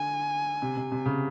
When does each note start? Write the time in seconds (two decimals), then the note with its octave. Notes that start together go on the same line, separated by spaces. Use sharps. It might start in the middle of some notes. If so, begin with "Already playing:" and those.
Already playing: D3 G#5
0.62 C3
0.77 C3
0.92 C3
1.06 C#3